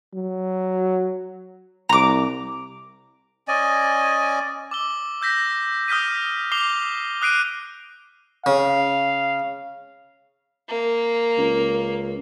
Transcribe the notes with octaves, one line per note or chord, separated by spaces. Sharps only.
F#3
C2 A#5 D6
C#4 D5 D#5 G#5
D6 E6 G7
E6 G6 A#6 B6
D#6 F6 G6 B6 D#7
D6 C7 F7 G7
D#6 F#6 C7 D7 D#7
C#3 F5
A#3
C#2